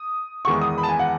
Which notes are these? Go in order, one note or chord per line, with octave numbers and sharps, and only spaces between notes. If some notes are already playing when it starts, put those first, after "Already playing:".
Already playing: D#6
E2 D#3 G#3 B3 C#6
D#6
B5
A5
G#5
F#5